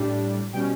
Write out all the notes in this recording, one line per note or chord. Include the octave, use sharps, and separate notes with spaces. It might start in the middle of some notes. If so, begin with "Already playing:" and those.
Already playing: A2 G3 D4
B2 G3 C#4 G5